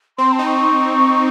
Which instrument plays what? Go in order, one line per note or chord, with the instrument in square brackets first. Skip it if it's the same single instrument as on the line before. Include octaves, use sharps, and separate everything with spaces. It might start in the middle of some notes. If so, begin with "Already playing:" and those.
[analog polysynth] C4 [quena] C6
[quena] A5
[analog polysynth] D#4
[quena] C#6